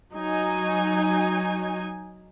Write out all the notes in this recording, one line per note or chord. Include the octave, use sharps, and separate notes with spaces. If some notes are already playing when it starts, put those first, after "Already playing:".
F#3 D#4 G#5